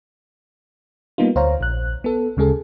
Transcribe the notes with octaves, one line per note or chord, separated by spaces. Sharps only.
G3 A#3 B3 D#4 F4
D2 C5 C#5 F5 A#5
A#1 F#6
B3 A4
D2 C#3 G#3 G#4 A4